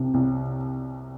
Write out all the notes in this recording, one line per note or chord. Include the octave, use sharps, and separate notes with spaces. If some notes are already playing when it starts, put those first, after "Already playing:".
Already playing: C2 C3
C2